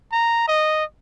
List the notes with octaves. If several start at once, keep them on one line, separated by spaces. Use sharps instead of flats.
A#5
D#5